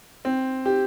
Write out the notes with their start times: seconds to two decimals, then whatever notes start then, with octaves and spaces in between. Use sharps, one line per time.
0.25 C4
0.65 G4